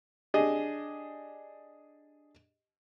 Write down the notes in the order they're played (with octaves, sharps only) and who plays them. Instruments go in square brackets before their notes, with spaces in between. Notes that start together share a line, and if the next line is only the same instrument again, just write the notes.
[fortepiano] D4 G4 G#4 D#5